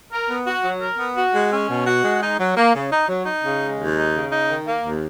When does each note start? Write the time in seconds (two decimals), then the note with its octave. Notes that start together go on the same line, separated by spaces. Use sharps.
0.12 A#4
0.29 B3
0.46 F#4
0.63 F#3
0.82 A#4
0.98 B3
1.16 F#4
1.34 G#3
1.52 C#4
1.69 B2
1.86 F#4
2.03 G#3
2.21 D#4
2.39 F#3
2.57 A#3
2.74 C#3
2.91 D#4
3.08 F#3
3.26 D#4
3.43 C#3
3.61 G#3
3.78 D#2
3.97 D#4
4.14 C#3
4.31 D#4
4.49 D#3
4.66 A#3
4.84 D#2